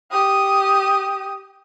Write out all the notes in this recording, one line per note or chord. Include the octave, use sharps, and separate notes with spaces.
G4 D#6